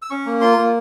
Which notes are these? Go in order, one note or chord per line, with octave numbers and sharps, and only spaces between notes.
E6
C#4 C#6
A#3
F4 C6
A#3